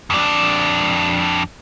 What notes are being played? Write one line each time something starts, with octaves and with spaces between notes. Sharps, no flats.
F2 D4